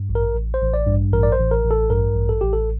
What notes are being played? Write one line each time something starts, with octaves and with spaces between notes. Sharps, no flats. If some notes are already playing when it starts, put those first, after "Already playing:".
Already playing: G2
A1
A#4
A1
C5
A1
D5
G2
A1 A#4
D5
C5
A1
A#4
A1
A4
G2 A#4
A1
A4
A1 G4
A4